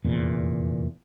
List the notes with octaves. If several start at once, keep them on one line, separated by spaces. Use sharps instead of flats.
F1 E2 A#2